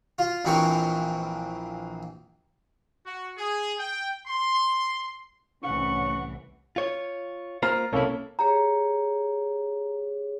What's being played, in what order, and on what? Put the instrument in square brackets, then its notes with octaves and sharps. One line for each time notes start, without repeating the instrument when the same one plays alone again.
[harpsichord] F4
A#1 A#2 E3 C4 A#4 C#6
[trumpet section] F#4
G#4
G5
C6
[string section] C2 A2 E3 [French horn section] C#4 [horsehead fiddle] F#5 [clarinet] C#6
[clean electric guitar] F4 C#5
[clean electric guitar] A#3 F4 C5 [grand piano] A#5 F6
[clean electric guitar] B1 C3 E4 [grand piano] A#3 C#4 A4
[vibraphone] G4 G#4 C#5 [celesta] A#5